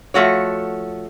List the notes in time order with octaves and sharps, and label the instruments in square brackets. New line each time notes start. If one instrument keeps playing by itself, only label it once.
[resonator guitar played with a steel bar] F3 A3 F#4 C#5